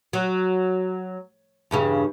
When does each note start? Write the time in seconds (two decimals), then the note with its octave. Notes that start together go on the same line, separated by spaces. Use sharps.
0.13 F#3
1.71 E2 G2 C#3